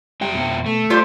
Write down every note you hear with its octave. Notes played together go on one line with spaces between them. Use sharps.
F2 G3 E5 G5
B2
A3
G3 F4 C5 G5 D6